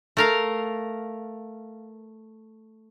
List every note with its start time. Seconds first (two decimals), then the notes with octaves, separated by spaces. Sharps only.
0.17 A3 A#4 F5